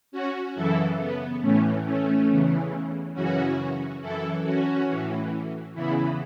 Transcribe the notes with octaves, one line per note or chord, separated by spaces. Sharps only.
C#4 F#4
F#2 C#3 E3 E4 A4
B3
A2 E3 A3 C#4
A3 C#4
E2 C#3 E3
F#2 C#3 E3 C#4 F#4
F#2 E3 E4 A4
C#4 F#4
A2 E3
E2 C#3 E3 B3 E4